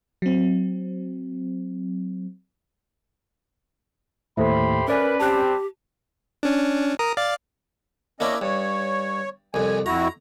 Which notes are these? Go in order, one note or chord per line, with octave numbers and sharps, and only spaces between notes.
F#3 C4
D#2 A2 G4 A4 C5 E5 B5 C6
C#4 A#4 B4 D5 G#5
G3 C4 G4 A5 F#6
C#4 D4
A#4 A#5 D#6
D5 F5 A6
A#3 C#4 D4 E4 D#5
G2 C#5
C2 F2 G#5
F2 E4 F#4 A#5